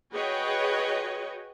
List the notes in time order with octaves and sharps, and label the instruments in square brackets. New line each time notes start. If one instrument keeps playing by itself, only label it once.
[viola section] F#4 G#4 B4 C#5 D#5 G5